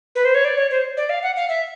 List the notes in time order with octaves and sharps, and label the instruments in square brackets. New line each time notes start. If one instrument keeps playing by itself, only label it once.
[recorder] B4
C5
C#5
D5
C#5
C5
D5
F5
F#5
F5
E5